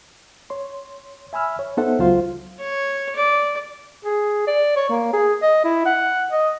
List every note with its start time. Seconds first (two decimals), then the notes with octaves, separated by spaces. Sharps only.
0.50 C#5 C6
1.33 E5 G#5 B5 E6 F6
1.59 C#5
1.77 B3 D#4 A4 C5 E5 F#5
1.99 C#2 F#3 F4 C5 F5 C6
2.60 C#5
3.16 D5
4.05 G#4
4.47 D5
4.76 C#5
4.89 A#3
5.13 G#4
5.43 D#5
5.64 E4
5.86 F#5
6.32 D#5